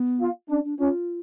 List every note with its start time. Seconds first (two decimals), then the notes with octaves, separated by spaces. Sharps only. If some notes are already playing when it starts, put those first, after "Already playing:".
Already playing: B3
0.20 F4
0.49 C#4 D4
0.64 D4
0.79 C#4 F4